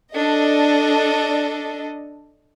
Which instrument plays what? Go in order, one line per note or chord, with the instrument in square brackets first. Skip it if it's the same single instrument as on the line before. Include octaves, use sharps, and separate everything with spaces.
[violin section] D4 A4 D#5